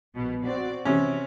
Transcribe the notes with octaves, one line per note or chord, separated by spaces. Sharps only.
A#1 B2
C4 F#4 D5
C3 E3 C#4